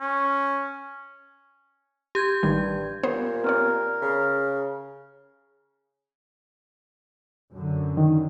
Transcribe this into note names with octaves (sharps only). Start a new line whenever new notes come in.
C#4
G4 G6 G#6
A1 G2 D#3 G3
A#2 B3 C5
B3 C4 A#4 C#5
C#3
F#2 D3
D#3